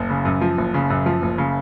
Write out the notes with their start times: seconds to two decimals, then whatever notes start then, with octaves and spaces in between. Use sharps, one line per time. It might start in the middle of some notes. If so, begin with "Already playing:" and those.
Already playing: F#1
0.10 C#3
0.25 F#2
0.41 F3
0.58 F#1
0.74 C#3
0.90 F#2
1.06 F3
1.22 F#1
1.38 C#3